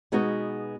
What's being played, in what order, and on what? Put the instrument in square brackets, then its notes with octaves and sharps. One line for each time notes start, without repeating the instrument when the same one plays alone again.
[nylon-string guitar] B2 G#3 B3 D#4 F#4